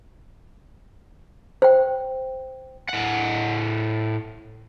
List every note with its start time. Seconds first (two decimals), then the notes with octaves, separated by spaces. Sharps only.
1.62 C5 G5
2.89 A2 F#5